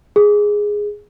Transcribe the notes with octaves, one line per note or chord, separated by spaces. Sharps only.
G#4